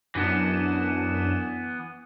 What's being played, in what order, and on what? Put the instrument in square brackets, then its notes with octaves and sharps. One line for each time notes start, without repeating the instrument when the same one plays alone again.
[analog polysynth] F#2 D4 E7 [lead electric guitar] E3 B3